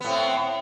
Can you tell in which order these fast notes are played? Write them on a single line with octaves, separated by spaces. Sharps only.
B3 A2 C4